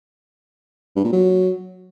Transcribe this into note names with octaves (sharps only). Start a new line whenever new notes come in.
G2
A#2
F#3